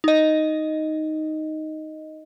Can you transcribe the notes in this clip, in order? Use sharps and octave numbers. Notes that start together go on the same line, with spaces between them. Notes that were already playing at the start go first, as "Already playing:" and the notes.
D#4 D#5